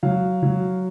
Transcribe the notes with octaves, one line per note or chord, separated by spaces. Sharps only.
F#3 F5
F#3